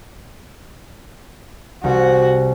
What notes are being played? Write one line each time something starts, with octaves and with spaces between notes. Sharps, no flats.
C2 F#4